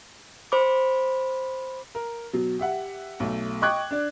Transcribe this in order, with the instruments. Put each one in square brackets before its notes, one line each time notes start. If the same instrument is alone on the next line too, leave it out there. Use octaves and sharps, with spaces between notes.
[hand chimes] C5 B5 D6
[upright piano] A#4
B2 F#3
G4 E5 F#5
B1 A3
D#5 G5 C#6 D6 F#6 G#6
D4 D5